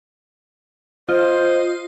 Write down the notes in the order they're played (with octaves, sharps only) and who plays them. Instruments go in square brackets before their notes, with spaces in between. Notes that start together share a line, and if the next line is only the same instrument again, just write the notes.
[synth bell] F4 [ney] C5 [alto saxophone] D#5